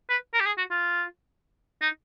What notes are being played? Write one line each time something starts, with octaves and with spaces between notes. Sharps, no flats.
B4
A#4
G4
G#4
F#4
F4
D#4